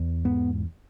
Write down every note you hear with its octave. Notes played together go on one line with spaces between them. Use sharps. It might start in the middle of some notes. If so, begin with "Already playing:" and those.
Already playing: E2
G#2 B3